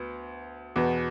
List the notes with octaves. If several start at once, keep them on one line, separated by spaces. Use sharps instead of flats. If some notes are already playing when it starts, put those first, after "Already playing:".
Already playing: D2 B3
E2 B2 B3